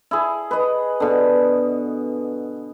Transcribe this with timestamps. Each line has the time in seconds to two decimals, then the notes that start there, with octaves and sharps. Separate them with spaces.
0.11 E4 G#4
0.51 B4 D#5
1.00 B2 D3